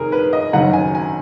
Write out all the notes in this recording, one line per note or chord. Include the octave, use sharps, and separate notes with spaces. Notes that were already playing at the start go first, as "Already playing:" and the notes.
Already playing: F1 D#3 G#4 A#4
B4
D#5
F#1 F#2 D#3 F#5
G#5
G#5